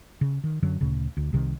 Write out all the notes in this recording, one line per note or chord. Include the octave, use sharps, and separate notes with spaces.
C#3
D#3
F#2 D3 F#3
D2 A#2 C#3
D2
C2 C3 D#3